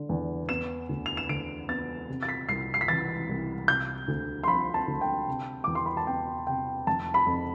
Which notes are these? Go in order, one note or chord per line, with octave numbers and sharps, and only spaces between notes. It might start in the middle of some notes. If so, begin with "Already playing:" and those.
Already playing: D3
E2
B3 E7
D2
F7
E7
D2 D7
B3 A6
C3
A6
B6
C2 C7
C7
B6
E3 A6
C2
C3 G6
D2
C6
F3 B5
A5
D2
G5
C3
E2 D6
C6
B5
A5
B3 G5
C3 G5
F1 A5
B5
F2